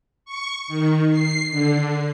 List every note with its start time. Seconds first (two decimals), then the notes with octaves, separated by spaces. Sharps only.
0.25 C#6
0.68 D#3
1.11 C7
1.50 D3